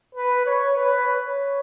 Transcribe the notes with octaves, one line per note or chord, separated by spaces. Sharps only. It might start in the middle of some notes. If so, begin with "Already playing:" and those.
B4
C#5
B4
C#5